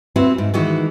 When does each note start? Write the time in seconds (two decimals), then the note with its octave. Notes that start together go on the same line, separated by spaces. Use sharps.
0.16 C4 E4 F#4 B4
0.38 G#2
0.54 D#3 E3 G#3 F#4